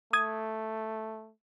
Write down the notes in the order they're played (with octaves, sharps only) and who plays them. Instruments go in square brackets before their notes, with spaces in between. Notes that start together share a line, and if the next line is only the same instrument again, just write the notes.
[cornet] A3 [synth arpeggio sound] D#6 G#6